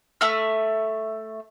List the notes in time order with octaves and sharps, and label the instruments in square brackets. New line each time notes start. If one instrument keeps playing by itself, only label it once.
[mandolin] A3 E5 E6 F6